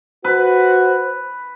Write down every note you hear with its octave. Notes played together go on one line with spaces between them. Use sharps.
F#4 B4 C5